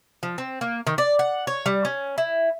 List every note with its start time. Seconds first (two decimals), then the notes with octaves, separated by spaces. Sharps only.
0.23 F3
0.38 C4
0.61 A#3
0.87 D#3
0.98 D5
1.19 F#5
1.47 C#5
1.66 G3
1.85 C#4
2.18 E4